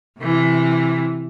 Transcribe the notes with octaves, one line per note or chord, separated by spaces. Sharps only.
C3 E3